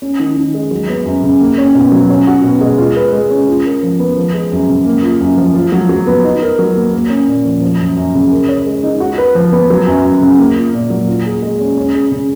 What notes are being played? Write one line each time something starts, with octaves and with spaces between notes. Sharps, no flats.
C#4
D#3
D#3
G#3
F#3
B3
F#2
C#3
A#3
C#4
B2
F#3
C#4
F#4
B2
G#3
F4
B4
G#3
C#4
F4
A#4
F3
B3
F3
G#3
F#2
C#3
A#3
F4
F#2
F3
F4
F#3
F#3
B3
D#4
A#4
F#3
A#3
A#3
C#4
A#2
F3
F3
F#2
F#2
C#3
A#4
C#5
G#3
D#4
F#4
B4
F3
B3
F#3
F#2
F#2
C#3
A#3
F4
A#2
F#3
F4
G#4
G#3
C#4
C#4
G#4
C#3